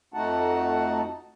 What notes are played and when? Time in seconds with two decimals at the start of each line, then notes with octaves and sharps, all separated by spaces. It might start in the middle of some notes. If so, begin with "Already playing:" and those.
0.14 F2 A3 D#4 F#4 F#5 A5